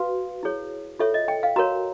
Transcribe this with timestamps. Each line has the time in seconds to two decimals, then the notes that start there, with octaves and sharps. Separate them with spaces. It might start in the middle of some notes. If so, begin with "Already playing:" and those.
Already playing: F#4 B4 F5
0.43 E4 G#4 C#5
0.99 F4 A4 C#5 E5
1.14 D#5
1.28 G5
1.43 F5
1.56 F#4 A#4 C#5 A#5